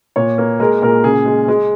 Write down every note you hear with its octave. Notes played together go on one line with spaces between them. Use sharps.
A#2 C#5
A#3
G#3 A#4
A#2 A#4
C#3 G#4
G#3
G#3